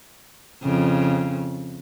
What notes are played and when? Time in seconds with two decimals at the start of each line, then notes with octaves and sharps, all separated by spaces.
0.63 F2 C#3